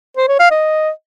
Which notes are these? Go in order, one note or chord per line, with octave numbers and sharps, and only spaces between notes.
C5
C#5
F5
D#5